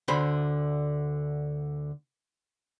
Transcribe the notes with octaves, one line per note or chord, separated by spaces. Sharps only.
D2 D3 C5 B5